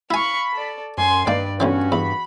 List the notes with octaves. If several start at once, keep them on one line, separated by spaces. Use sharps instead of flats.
E4 F5 G#5 B5 C#6
A4 D5
F#2 G#5 C6
G2 D#3 A#3 B4 D5
B1 D3 E3 C#4 F#4
E2 B5